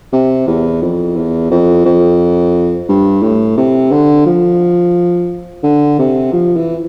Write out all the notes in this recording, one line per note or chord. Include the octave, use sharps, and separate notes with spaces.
C3
E2
F2
E2
F2
F2
G2
A2
C3
D3
F3
D3
C3
F3
E3